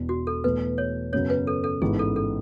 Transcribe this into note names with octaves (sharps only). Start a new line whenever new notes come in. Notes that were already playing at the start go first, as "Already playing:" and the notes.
Already playing: E1 E2 B2
F#4
A4
E2 B2 A3 B4
C#5
F#2 C#3 F#3 B3 C#5
B4
A4
A4
A1 G#2 G#3 B3 E4 G#4
A4
A4